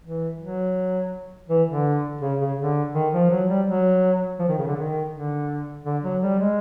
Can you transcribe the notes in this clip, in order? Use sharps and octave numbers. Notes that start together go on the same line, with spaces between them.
E3
F#3
E3
D3
C#3
C#3
D3
D#3
F3
F#3
G3
F#3
F3
D#3
C#3
D3
D#3
D3
D3
F#3
G3
G#3